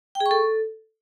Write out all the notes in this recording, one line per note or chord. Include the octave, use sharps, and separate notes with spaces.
G5
G#4
C#6
A4